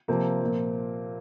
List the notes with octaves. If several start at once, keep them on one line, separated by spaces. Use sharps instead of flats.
C3 F3 A#3 C4
A#2 F3